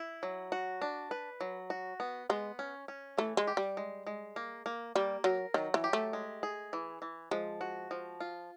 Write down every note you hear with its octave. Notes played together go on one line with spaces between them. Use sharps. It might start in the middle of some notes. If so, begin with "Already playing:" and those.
Already playing: E4
F#3
F#4
D4
B4
F#3
F#4
B3
G#3 B3
C#4
C#4
E3 A3
G#3
G4
G3
G#3
G#3
A#3
A#3
G3 A#3
F#3 A#4
D#3 F#3
E3
G4
A3
G#3
G#4
E3
E3
F3 G#3
F#4
F3
F4